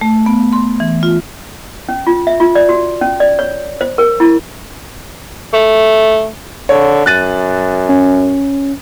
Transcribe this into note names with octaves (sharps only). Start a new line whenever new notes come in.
A3
B3
C6
E3
F4
C#4
F4
E5
F4
D5
F#4
C#4
D5
C#5
C5
A#4
E4
A3
D3 C#5
F#2 F#6 A6 D#7
C#4